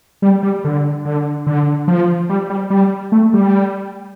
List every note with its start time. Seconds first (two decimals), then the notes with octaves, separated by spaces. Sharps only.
0.22 G3
0.43 G3
0.64 D3
1.05 D3
1.47 D3
1.88 F3
2.30 G3
2.50 G3
2.70 G3
3.12 A3
3.33 G3